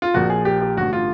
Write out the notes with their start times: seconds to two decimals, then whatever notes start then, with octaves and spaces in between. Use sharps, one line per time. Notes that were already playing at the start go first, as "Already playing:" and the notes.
0.02 F4
0.14 A#1 A#2 F3 F#4
0.30 G#4
0.45 G4
0.61 G4
0.77 A1 G2 D3 F#4
0.93 F4